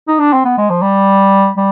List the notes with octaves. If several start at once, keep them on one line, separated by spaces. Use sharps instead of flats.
D#4
D4
C4
B3
G#3
F3
G3
G3